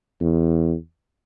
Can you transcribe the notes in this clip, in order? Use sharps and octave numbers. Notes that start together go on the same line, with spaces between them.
E2